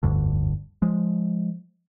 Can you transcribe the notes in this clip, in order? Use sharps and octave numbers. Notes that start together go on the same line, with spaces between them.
F1 D2 G2 D3
F3 G#3